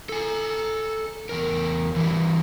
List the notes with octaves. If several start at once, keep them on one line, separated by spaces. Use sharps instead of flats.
A4 G#5
E2 A#4
E3 G3